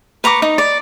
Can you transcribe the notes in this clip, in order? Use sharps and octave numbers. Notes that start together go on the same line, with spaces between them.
B4 A#5 C#6 D6
D#4
D5